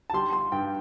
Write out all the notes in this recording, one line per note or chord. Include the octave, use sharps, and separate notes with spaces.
A5
G3 C6
C6
G2 G5